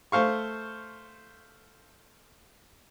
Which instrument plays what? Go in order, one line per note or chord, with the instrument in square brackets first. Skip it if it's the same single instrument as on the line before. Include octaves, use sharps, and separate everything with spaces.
[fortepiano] A3 C5 F5 C#6